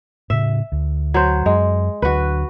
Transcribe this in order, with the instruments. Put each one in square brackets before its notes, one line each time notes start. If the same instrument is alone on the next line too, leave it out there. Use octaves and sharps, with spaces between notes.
[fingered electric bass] A2 C#3 [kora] E5
[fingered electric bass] D2
[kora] F#3 C5
[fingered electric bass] F#2 [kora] G#3
[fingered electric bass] D2 F#3 D4 [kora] F#4 B4